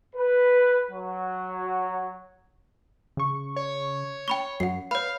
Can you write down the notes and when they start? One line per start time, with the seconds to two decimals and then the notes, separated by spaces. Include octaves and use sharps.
0.16 B4
0.91 F#3
3.17 C#3 C#6
3.56 C#5
4.28 G5 B5 C#6
4.60 F#2 F#5 C7
4.91 B4 C#5 F5 B5